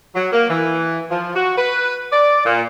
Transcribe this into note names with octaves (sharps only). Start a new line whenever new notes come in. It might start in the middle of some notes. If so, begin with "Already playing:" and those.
F#3
A#3
E3
F3
F#4
B4
D5
A#2